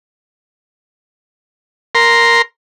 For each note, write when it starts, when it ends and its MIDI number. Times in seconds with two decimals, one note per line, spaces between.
1.95 2.42 70
1.95 2.42 84